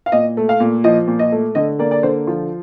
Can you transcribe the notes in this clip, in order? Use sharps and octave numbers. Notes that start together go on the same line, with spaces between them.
F5
A#2 D#5
A3
F5
A#2
F3 D#5
A#2
D#5
A3
D3 D#5
A#3 D5
D5
D3 C5
F3 F4